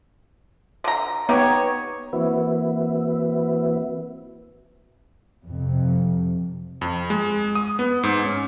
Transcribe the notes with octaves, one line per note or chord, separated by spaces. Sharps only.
D3 A#5
B3 D#4 G4 C#5 A#5
E3 A#3 C4 F#4 B4 E5
F2 C3
F2
G#3
D#6
B3
G#2
C#4